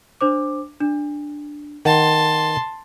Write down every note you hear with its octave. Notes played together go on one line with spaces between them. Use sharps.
D4 C5 D6
D4
D#3 F#5 A5 C6